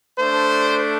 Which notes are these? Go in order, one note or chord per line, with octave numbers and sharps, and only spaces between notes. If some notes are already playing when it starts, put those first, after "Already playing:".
A3 D4 C5